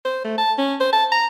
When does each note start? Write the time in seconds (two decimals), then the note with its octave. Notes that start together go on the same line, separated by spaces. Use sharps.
0.05 C5
0.24 A3
0.38 A5
0.58 C#4
0.80 C5
0.93 A5
1.12 A#5